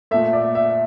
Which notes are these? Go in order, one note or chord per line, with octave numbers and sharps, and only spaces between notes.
A#2 A3 E5
D5
E5